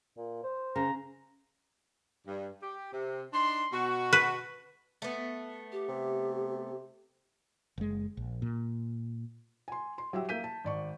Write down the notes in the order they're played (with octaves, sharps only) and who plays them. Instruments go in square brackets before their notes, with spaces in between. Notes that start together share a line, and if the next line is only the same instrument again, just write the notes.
[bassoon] A#2
C5
[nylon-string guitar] C#3 [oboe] A#5
[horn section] G2
G4
C3
D4 D#4 C6
B2 F#4
[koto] B4
[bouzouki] A3 B3
[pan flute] G4
[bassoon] C3
[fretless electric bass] F#1 G#3
A#1
A#2
[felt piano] G#5 C6
C6
F#3 G4 E5 G5 E6
A#3 E5 G6 B6 D#7
A5
G#1 D5 C#6